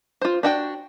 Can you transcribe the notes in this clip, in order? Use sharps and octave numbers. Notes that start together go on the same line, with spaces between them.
F4 C5
D4 F#4 G5